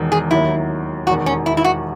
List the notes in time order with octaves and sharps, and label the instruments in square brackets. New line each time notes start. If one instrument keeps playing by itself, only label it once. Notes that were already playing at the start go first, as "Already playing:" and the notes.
Already playing: [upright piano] E1 E2 D#3
[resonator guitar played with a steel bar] G#4
[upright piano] D#2 D#3 F#3 [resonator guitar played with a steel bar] E4
[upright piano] E1 E2 D#3 [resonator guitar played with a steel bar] F#4
[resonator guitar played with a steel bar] C#4
E4
E4
F#4